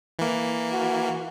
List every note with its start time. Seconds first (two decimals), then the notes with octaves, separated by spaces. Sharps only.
0.19 E3 A#3
0.72 F#4